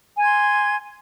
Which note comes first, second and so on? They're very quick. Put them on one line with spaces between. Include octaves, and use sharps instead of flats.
G#5 G#6 C6